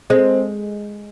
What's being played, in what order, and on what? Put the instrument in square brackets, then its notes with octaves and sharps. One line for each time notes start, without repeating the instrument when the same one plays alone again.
[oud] G#3 [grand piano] C4